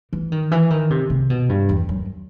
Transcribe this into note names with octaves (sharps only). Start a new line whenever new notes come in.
E3
D#3
E3
D#3
C3
C3
B2
G2
E2
F#2